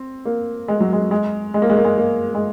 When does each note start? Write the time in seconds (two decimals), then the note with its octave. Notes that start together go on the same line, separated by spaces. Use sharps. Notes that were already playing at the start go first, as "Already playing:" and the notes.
Already playing: C4
0.25 A#3
0.68 G#3
0.80 F#3
0.93 G#3
1.11 G#3
1.54 G#3
1.62 A#3
1.70 G#3
1.77 A#3
1.85 G#3
1.98 A#3
2.35 G#3